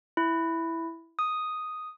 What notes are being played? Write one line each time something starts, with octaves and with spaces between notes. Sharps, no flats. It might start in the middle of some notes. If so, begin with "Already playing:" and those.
E4
D#6